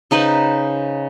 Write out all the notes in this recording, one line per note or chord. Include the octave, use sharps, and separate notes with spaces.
C#3 D#4 B4 C5